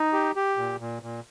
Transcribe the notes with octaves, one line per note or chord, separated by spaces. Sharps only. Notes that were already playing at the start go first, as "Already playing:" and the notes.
Already playing: D#4
G4
G4
A#2
A#2
A#2